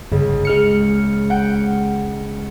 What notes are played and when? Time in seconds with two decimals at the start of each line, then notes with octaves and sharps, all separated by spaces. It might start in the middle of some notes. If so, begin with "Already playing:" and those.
0.12 G1 C#2
0.45 G#3 F6 C#7
1.30 F#5 G5